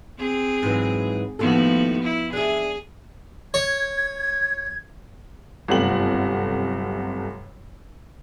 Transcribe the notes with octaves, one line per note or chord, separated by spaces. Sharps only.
C4 G#4
G#2 E3 F#3
D#2 A2 F3 B3 F#4 A4
E4
D4 G#4 E5
C#5 G#6
G1 F#2 C3 A3 F#5 F#7